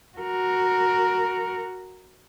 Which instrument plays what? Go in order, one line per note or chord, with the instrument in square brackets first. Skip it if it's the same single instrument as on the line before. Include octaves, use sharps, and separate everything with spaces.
[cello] F#4 A#4